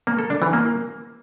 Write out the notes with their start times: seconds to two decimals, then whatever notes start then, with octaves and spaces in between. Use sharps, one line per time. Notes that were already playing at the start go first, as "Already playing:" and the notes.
0.07 A#3
0.19 A4
0.30 D4
0.42 E3
0.53 A#3